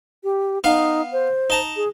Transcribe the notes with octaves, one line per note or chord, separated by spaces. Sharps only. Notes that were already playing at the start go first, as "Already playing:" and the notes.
G4
B3 D#4 F5
C5
D#4 A5 A#5
G#4